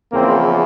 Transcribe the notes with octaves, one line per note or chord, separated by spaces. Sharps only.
E2 C#3 F3 A#3 C4